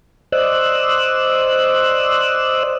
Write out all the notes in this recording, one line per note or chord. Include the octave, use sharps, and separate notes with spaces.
C5 D5 D#5 E6 F#6